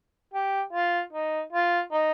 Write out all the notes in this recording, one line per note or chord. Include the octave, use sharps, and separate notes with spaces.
G4
F4
D#4
F4
D#4